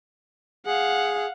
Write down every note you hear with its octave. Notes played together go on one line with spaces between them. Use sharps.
G#4 F5 F#5